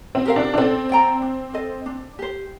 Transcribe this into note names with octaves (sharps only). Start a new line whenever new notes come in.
C4
G4 A#4 F5
D4
D4
C4 A4
D5 G5 A#5
D4
A4 C5 D#5
D4
G4 C5